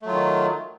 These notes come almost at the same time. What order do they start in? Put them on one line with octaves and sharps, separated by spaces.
A3 F#3 F4 D#3